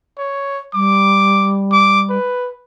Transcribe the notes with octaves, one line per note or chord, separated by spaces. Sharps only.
C#5
G3 D6
D6
B4